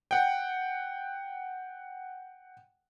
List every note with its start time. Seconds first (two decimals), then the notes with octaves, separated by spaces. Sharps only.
0.11 F#5 G5